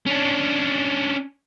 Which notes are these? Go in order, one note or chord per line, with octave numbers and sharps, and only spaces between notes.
C#4 D4